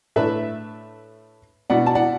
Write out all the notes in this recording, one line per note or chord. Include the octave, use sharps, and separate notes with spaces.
A2 A3 D4 B4 E5
B2 B3 D4 D5 F#5
A5
D5 F#5